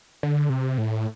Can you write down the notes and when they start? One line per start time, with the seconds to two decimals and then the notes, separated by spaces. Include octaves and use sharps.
0.23 D3
0.49 C3
0.78 A2